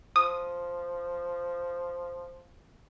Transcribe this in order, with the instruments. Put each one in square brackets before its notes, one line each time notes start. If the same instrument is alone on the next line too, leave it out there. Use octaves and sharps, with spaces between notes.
[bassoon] F3 [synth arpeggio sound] D#6